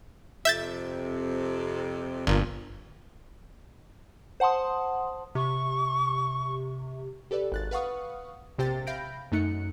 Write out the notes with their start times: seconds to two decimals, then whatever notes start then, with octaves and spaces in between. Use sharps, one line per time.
0.45 F2 C3 E5 G6 A6
2.27 G1 A#2
4.40 C5 F#5 A5 C6 D#6
5.35 C3 C#6
7.31 G4 A4 B4 D5
7.52 G#1 F#6 A6
7.71 B4 F5 F#5 C#6 D#6
8.58 A#1 C3 G4 C5 G5 A6
8.87 E5 F5 B5 G6 A#6 D7
9.32 F#2 A3 D#4 F#6 C#7